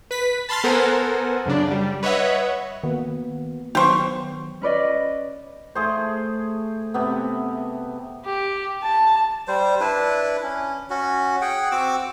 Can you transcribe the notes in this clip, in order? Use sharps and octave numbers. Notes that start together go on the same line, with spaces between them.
B4 B6
A5 B5 C6 F6 A6
B3 A4 A#4 C5 F#5 G#5
F#2 C#3 D4
G3
B4 C#5 D#5 E5 F#5
D#3 A#3 B3 F#4
D#3 F#3 B3 G4 C5 C#6
C#4 B4 D5 D#5
A3 G#4 C5
C3 B3
G4
A5
G3 C5
D4 E4 B4
C#4
C#4 F#4
G#4 F#5 G5
C4 F#4 D6 E6